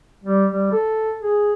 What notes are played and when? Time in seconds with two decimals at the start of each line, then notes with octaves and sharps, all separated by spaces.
0.24 G3
0.51 G3
0.72 A4
1.22 G#4